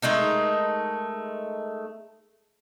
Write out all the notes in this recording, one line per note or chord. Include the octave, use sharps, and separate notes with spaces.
G#3 A3 D#4 A#4